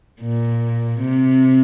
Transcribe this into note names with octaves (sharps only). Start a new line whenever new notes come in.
A#2
C3